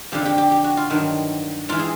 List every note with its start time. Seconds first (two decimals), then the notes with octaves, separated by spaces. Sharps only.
0.12 F2 D3 F3 G4
0.25 G4
0.38 G4
0.52 G4
0.64 F#4
0.77 F4
0.90 G2 D#3 F#3
1.69 G#2 E3 F4
1.79 G#4